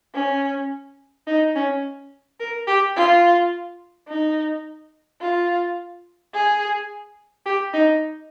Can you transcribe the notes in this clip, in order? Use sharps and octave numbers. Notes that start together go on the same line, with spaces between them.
C#4
D#4
C#4
A#4
G4
F4
D#4
F4
G#4
G4
D#4